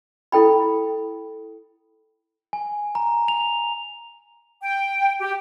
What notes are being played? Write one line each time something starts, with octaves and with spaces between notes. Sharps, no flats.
E4 A4 G5 B5
G#5
A#5
F7
G5
G4